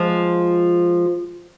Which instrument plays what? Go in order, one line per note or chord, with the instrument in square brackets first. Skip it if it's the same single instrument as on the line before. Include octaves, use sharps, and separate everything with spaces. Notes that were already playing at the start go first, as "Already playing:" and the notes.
Already playing: [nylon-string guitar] F3 G#3